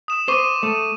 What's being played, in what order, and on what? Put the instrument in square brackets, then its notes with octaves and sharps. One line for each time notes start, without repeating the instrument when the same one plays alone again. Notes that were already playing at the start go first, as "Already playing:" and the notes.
[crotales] D#6 E7
[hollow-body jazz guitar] C5 [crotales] C#6 D6 D#7
[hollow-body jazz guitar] A3